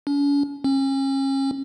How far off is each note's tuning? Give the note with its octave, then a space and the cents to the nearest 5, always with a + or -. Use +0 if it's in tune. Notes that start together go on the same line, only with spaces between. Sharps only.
C#4 +45
C#4 -35